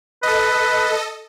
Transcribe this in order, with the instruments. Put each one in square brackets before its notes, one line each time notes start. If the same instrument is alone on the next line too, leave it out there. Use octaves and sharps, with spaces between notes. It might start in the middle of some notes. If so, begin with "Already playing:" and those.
[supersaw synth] A4 D#5 [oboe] B4